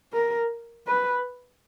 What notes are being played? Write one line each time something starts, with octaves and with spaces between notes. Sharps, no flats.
A#4
B4